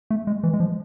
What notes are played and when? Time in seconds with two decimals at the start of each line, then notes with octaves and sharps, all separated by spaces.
0.11 A3
0.27 G#3
0.44 E3
0.54 G#3
0.60 F3